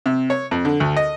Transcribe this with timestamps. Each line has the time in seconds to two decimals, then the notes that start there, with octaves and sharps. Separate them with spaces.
0.06 C3
0.30 C#5
0.51 F2
0.65 D3
0.80 D2
0.97 D#5